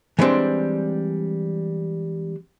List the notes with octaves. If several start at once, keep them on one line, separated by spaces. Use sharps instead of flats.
E3 G3 G#3 C4 D4